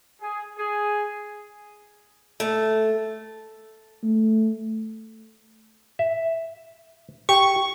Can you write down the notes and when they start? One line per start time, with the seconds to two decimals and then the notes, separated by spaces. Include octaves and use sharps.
0.21 G#4
0.57 G#4
2.40 A3
4.03 A3
5.99 E5
7.29 G4 C#6